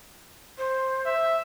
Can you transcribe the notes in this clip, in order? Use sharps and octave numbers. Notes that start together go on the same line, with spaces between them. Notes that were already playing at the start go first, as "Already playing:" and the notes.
C5
E5